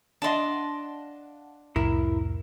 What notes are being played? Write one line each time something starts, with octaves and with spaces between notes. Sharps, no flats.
D4 D5 D#5 F5 F#5 A5 C6
C2 F2 A2 E4 A#4